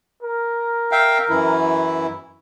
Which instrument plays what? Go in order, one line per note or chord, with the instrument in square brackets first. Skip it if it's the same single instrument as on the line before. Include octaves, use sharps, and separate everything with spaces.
[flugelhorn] A#4
[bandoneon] E5 F5 G5
F#2 E3 E4